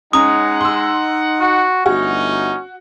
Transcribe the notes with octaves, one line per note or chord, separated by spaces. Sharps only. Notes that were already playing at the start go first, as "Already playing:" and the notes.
G#3 C#4 D#4 F#5 A#5 D#6
C6 E6
F#4
G1 A3 C#4 D#4 F#4